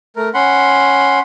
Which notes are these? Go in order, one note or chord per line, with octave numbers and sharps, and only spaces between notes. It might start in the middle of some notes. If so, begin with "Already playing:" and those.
A3 A#4
C#4 F#5 B5 C6